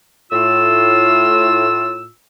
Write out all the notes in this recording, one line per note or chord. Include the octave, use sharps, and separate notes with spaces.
A2 F4 E6